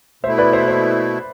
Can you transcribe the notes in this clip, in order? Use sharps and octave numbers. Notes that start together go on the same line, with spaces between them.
B2 A3 E4 C5 E5
B4 D5
C5 E5
C5 E5